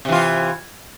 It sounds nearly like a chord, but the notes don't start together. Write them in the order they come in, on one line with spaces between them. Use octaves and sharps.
C3 E3 F4